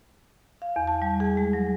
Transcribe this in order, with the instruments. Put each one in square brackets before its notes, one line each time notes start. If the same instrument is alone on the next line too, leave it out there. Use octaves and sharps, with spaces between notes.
[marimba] F5
E2
A5
G3
G#4
G#3
F#3